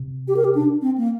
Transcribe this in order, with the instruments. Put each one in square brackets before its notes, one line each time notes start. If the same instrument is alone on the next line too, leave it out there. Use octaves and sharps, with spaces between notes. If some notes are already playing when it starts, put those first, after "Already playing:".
Already playing: [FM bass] C3
[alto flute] G4
A#4
G4
D4
C4
A#3